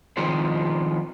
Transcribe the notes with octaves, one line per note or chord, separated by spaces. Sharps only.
D#3 F3 G#3 C4